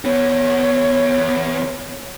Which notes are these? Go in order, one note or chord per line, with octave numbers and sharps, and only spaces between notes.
E2 B3 C#5